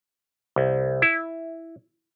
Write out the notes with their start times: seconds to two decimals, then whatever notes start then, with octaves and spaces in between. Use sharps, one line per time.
0.56 C2
1.02 E4